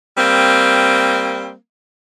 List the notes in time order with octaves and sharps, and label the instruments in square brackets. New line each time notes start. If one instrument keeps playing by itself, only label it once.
[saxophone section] G3 A#3 C4